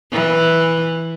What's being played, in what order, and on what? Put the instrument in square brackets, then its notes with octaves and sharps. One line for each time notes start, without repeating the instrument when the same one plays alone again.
[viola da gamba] E3